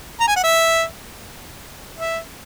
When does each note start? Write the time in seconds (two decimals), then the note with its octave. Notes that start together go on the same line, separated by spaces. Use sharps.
0.20 A#5
0.27 G#5
0.36 F#5
0.43 E5
1.98 E5